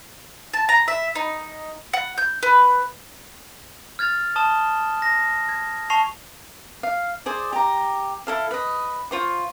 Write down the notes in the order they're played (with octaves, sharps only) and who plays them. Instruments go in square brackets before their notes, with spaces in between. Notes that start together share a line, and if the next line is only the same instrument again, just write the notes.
[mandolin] A5
A#5
E5
D#4
F#5
G6
B4
[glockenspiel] F6 G#6 A6 F7
A5 D#6 E7 G7
A#6
G#6
A5 C#6 C7 F7
[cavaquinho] F5
G#4 C5 D5
G4 A#5
E4 A4 F5
B4 D#5
F4 C5 C#6